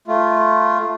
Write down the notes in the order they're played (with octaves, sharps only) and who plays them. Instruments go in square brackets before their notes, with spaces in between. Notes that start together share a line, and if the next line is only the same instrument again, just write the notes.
[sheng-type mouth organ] A3 F4